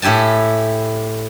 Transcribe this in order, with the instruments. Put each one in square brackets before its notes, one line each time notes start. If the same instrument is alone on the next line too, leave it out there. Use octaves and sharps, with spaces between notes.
[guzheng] A2 E4 G4 G#5 A5